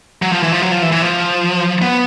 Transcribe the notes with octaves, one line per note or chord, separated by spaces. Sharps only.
F#3
F3
E3
F3
F#3
F3
E3
E3
F3
B3